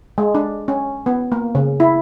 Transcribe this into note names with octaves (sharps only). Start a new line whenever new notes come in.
G#3
D4
C#4
B3
A#3
C#3
E4